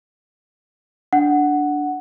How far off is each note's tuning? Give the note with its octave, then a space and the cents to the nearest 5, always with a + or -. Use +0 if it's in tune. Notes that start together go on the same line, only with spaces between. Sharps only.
D4 +0 F#5 +0